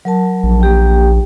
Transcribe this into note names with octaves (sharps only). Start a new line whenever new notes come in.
F#3 A#4 A5
A#1
A#3 G4 G5